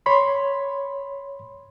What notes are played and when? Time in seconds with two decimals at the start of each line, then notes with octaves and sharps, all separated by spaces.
0.06 C#5 B5 C6